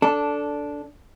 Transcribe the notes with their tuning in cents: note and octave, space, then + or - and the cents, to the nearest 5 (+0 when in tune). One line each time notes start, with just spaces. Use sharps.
D4 -10 A4 +0